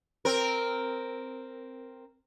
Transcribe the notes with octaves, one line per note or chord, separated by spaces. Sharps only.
C4 A#4